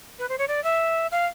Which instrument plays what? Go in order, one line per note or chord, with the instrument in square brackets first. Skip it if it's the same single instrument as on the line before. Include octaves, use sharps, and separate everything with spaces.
[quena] B4
C5
C#5
D5
E5
F5